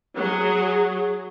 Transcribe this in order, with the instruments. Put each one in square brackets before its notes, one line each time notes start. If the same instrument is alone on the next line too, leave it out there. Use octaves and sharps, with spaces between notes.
[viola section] F#3 G#4